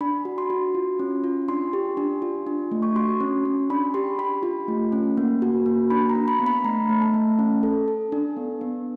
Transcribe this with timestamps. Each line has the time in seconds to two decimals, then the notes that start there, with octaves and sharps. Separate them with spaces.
0.01 D4 B5
0.25 F#4
0.38 C6
0.50 F#4
0.75 F4
0.99 C#4
1.24 F4
1.48 D4 C6
1.73 G4
1.97 D4
2.22 F4
2.47 D4
2.71 A3
2.82 C#6
2.96 F#4 C6
3.20 C#4
3.45 C#4
3.70 D4 B5
3.94 G4 C6
4.19 G4 B5
4.43 F4
4.68 A3
4.92 C#4
5.17 A#3
5.42 F#4
5.66 A#3
5.90 D4 B5
6.10 A#5
6.15 D4
6.28 B5
6.40 B3
6.46 B5
6.64 A3 A#5
6.89 A3
7.02 A5
7.14 A3
7.39 C#4
7.63 A4
7.88 A4
8.12 D4
8.37 B3
8.61 B3